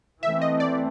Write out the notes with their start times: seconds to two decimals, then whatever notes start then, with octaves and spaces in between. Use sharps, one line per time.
0.22 E3 A3 C4 E5
0.42 D#5
0.60 D5